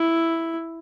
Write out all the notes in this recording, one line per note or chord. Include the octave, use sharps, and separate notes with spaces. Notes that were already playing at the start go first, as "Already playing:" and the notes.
Already playing: E4